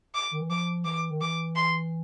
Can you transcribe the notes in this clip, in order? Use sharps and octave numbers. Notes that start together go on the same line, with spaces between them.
D6
D#3
E3
F3 D6
E3 D6
D#3
E3 D6
C6